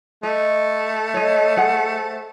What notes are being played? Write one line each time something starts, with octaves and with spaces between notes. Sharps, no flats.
A3 D#5
C#5 D#5
G#4 C5 F#5